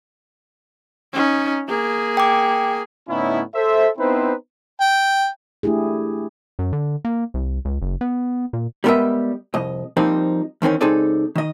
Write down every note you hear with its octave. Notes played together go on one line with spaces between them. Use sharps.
C#4 D#4
A#3 G#4
G5 D6
A2 D3 B3 C#4 D#4 E4
A4 C5 E5
B3 C4 D#4 E4 B4 C5
G5
A3 D4 E4 G4 G#4
F#2
D3
A#3
C2
C#2
F#1
B3
A#2
G3 G#3 B3 A#4 D#5 E5
C2 F2 D#5
F3 G3 A#3 C4 D#4
E2 D#3 C4 C#4
C#2 C4 D#4 G#4 A4 D5
D#3 D#5